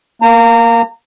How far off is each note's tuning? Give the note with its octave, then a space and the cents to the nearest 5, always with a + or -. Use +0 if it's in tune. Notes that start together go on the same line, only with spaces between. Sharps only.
A#3 +0 A#5 -30